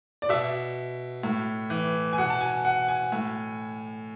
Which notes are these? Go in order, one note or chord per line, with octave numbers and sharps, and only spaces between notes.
D5
B2 E5
A2
E3
G#5
B2 F#5
A5
G#5
F#5
G#5
A2